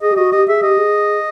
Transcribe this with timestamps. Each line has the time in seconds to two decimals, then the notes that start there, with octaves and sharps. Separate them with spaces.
0.02 G#4 D#5
0.12 G4
0.17 F#4 D#5
0.32 G4 D#5
0.48 G#4 E5
0.63 G4 D#5
0.78 G#4